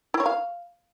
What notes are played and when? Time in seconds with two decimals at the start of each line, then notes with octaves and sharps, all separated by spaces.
0.14 E4
0.20 C#5
0.26 F5